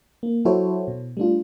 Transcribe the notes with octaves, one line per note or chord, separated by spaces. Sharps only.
A#3
F#3 E4 F#4 A4 C5 C#5
B2
G3 A3 D4 F4